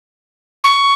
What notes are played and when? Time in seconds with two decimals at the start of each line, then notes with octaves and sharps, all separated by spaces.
0.64 C#6